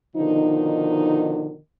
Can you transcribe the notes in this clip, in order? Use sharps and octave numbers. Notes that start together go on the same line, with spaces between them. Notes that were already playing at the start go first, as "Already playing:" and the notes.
B2 D3 D#3 F3 D#4